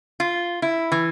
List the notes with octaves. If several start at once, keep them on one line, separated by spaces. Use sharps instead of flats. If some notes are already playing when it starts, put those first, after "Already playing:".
F4
E4
E3